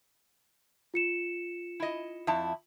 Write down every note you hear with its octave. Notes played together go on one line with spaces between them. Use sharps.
F4 C#7 E7
E4 D#5
F2 E4 A5